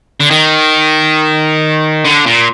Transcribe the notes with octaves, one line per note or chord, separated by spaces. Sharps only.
D3
D#3
D3
A#2